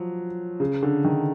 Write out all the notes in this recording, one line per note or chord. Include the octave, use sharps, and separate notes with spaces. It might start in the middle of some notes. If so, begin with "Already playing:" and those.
Already playing: F3 F#3
C#3
D3
D#3